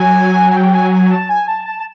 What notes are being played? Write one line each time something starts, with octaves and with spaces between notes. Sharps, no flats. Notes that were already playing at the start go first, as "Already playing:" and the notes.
Already playing: F#3 G#5
G#5
G5
G#5
G#5
A5
G#5
A5
A5
A5